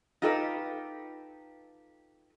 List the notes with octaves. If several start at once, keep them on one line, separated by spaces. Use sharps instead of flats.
D#4 F4 G4 A4 B4 D#5